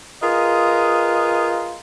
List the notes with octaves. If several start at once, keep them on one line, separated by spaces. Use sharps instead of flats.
F4 G#4 A#4 B4 D#5